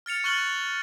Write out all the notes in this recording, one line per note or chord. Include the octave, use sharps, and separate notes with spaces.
F6 A6 C#7 F7
C#6 F6 F#6 A6 F#7 G7